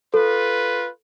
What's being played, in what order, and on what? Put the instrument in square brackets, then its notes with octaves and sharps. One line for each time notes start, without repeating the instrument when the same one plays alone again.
[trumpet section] F4 B4 [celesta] A4